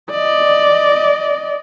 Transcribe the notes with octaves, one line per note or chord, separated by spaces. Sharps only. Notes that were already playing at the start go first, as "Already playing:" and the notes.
D5 D#5